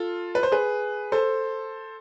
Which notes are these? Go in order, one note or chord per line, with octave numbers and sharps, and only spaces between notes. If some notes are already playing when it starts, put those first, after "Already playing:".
Already playing: F4 A4
B4
C5
G#4 B4
A4 C5